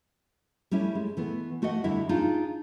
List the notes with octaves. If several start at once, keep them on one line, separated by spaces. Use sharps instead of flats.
G3 A3 C#4 E4
G#3
E3 A3 B3
A3 F#4 D5 D#5 F#5
E2 D3 G3 E4 E5
D4 D#4 F4 G#4